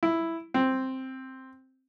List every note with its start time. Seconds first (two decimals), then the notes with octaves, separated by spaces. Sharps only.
0.03 E4
0.54 C4